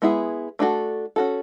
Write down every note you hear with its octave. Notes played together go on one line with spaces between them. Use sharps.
G#3 B3 E4 G#4
A3 D4 F#4 A4
C#4 F#4 A4